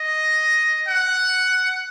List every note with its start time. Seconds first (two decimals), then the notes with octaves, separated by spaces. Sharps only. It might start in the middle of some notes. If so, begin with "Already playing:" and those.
Already playing: D#5
0.88 F#5